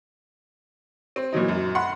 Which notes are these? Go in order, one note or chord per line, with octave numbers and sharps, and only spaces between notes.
C4
A#2 E3 F#3 D#4
F#2
F#5 B5 C6